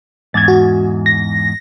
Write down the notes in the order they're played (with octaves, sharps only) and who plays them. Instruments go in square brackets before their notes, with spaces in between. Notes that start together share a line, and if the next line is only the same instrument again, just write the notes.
[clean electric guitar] E2 G#2 [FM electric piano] G#6 A6
[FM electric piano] F#4
A#6